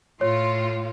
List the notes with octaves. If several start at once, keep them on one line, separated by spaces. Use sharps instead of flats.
A2 F4 C#5 C6